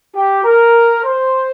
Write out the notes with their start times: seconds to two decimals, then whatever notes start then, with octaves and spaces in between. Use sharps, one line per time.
0.15 G4
0.44 A#4
1.03 C5